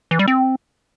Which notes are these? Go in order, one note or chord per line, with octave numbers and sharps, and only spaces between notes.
E3
G3
C4